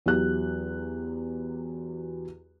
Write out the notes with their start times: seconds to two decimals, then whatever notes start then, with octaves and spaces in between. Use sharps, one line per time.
0.06 E2 F#3 F#4 G4 F#6